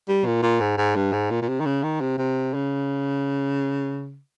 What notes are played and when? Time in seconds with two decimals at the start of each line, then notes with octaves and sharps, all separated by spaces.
0.09 G3
0.26 A#2
0.42 A#2
0.61 G#2
0.78 G#2
0.96 G2
1.13 G#2
1.30 A#2
1.42 A#2
1.48 C3
1.60 D#3
1.66 C#3
1.83 D#3
2.00 C3
2.18 C3
2.54 C#3